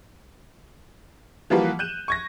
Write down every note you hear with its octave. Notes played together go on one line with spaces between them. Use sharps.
E3 F3 G3 A#3 F#4 B4
F#6 G6 D#7 E7
C#6 G#6 A#6